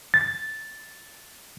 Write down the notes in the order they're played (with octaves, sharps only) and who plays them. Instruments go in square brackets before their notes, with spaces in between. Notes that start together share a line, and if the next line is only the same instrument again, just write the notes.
[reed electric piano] A6